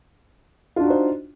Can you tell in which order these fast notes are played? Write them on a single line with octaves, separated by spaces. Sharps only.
F4 D4 F#4 D#4 C5